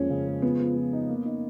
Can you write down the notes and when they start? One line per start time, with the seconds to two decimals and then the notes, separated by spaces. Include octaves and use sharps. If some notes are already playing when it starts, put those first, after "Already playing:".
Already playing: F2 G#3 A#3 C#4
0.10 C#3
0.27 G#3
0.42 F3 B3
0.60 F3
0.76 F3
0.93 D#4
1.09 A#3
1.25 D#4